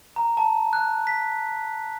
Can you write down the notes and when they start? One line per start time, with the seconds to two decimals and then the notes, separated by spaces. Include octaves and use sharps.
0.16 A#5
0.37 A5
0.73 F#6
1.07 B6